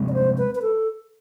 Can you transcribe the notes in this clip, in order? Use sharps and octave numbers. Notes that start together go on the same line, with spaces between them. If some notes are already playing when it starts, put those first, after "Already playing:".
Already playing: C3 F3 G#3 C4
D5
C5
B4
B4
A4